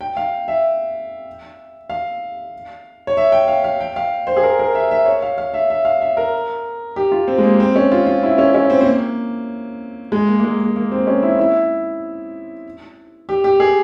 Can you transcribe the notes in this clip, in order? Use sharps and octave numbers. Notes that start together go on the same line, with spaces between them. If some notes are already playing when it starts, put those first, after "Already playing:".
G5
F5
E5
F5
C#5
E5
G5
F5
F5
G5
F5
C5
G#4
A#4
A#4
E5
E5
C#5
F5
F5
E5
E5
F5
E5
A#4
G4
F4
C4
G#3
A#3
C4
C#4
F4
F4
E4
C#4
C#4
C4
C4
A#3
G#3
A#3
A#3
G#3
A#3
A#3
C4
C#4
E4
E4
G4
G4
G#4